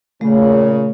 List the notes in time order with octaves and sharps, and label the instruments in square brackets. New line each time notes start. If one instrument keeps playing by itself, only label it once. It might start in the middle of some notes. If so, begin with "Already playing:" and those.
[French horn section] A#2 C#3 [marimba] A3